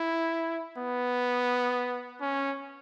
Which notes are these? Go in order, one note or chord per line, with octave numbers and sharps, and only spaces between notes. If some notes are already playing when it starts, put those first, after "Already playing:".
Already playing: E4
B3
C#4